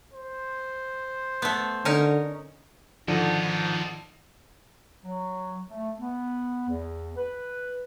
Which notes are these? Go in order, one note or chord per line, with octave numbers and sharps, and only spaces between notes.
C5
A3 B3
D3 C#4 D#4 A#4
G#2 D3 D#3 F3 D#4 F4 A4 D#5
F#3
A3
B3
E2
B4